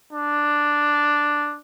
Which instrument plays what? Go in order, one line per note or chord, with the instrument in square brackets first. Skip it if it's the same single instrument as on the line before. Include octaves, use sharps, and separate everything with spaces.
[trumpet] D4